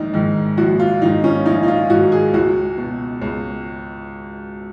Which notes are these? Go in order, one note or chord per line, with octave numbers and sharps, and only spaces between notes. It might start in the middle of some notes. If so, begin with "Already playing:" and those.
Already playing: A#1 G#2 D#3 D#4
G#2 D#3
A#1 F#4
F4
G#2 D#3 D#4
C#4
A#1 D#4
D#4
F4
G#2 D#3 F#4
G#4
C#2 F#4
B2
C#2